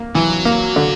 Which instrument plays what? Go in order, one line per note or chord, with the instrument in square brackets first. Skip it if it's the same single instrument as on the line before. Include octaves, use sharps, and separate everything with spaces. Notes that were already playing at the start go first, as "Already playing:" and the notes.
Already playing: [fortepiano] A#3
[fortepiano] E3 [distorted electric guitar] F#3
[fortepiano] A#3
D3